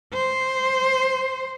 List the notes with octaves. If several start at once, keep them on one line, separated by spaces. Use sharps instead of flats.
C5